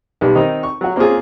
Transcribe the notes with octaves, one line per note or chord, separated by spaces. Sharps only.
B1 G3
D#3 C4 D#4
C#6
F#3 F#4
A#3 C4 C#4 F4 G#4